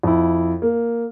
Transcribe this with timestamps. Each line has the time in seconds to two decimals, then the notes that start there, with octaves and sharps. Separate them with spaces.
0.03 F2 E4
0.62 A#3